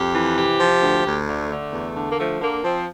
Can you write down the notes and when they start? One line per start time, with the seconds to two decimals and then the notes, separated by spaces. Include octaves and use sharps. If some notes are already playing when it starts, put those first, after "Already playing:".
Already playing: F2 G4
0.15 E3
0.37 C3 G4
0.60 F3
0.82 D2
1.06 D2
1.28 D3 A3
1.51 D3
1.73 E2
1.96 D3
2.11 A#3
2.18 F3 A3
2.41 D3 A#3
2.64 F3 C4